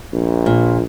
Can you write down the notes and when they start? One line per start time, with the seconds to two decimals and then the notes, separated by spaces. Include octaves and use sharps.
0.13 A#1
0.46 A#2